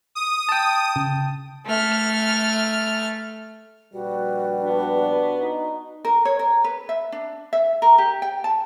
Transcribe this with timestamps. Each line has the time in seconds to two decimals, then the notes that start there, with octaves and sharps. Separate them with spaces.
0.15 D#6
0.49 G5 A5
0.96 C#3
1.66 A3 F6
3.93 A#1 G3 F#4 B4
4.61 B3 D4
5.41 D#4
6.05 A#4
6.25 C#5
6.39 A#4
6.64 B4
6.89 E5
7.12 D4
7.53 E5
7.82 A#4
7.98 G4
8.22 G5
8.44 A5